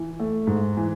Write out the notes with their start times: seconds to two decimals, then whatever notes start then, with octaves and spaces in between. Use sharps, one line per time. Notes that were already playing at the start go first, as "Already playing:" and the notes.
Already playing: E3
0.20 A3
0.47 G#2
0.77 E3